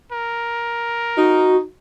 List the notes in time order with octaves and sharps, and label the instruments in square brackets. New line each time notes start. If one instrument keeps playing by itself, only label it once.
[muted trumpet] A#4
[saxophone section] D#4 [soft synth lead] F#4